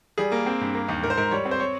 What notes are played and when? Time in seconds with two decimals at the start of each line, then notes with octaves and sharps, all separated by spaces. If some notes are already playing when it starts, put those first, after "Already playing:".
0.18 G3 G#4
0.32 A#3
0.46 C4
0.61 G2
0.74 A#3
0.88 D#2
1.03 G#2 A#4
1.10 C5
1.17 G#2 A#4
1.31 G3 C#5
1.45 C4
1.51 C5
1.60 C#5